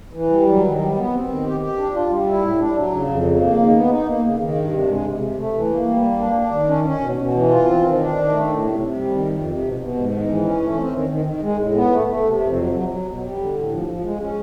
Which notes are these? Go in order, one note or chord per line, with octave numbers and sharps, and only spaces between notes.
E3
G3
F#3
D#3
G3
B3
C4
D#3
G4
G4
D4
F4
G3
E4
A2
D4
F#3
C#3
F2
C#3
A#3
D#3
B3
D#4
A#3
C#3
D#3
G2
C3
G#3
C3
C3
A3
E3
A#3
G3
A#3
D4
D4
D#3
C#4
C#4
B2
B2
E3
F4
C4
D#3
D4
D#3
A3
A2
C3
C3
G3
D#3
F2
C3
B2
B2
G#2
D#3
E3
C#4
A3
C4
D#3
D#3
D#3
G#3
A2
B3
A3
A3
C3
F2
F#3
F#3
F#3
B2
G3
D3
A2
F3
F3
G#3
C#4